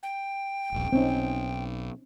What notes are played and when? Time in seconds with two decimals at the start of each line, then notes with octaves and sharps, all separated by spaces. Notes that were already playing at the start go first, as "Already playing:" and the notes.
0.03 G5
0.72 D#1 A#1
0.93 B1 C4 C#4 D#4